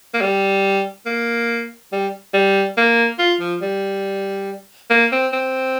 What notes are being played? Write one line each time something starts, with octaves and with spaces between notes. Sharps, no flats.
A#3
G3
A#3
G3
G3
A#3
F4
F3
G3
A#3
C4
C4